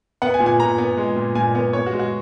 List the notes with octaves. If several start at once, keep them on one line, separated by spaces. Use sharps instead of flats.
B3 F#5
G#5
A#2
G#5
A#2 A#5
B3
G#3
A#2
A#2 G#5
B3
B3 C#5
F#4
G#3
F#4